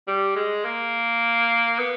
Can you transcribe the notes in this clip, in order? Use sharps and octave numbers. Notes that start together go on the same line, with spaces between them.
G3
G#3
A#3
B3